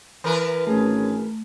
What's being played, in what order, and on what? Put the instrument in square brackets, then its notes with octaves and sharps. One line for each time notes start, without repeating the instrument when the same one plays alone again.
[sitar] E3 A#4 B4
[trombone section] G#1 C#4 G#4 [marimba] A3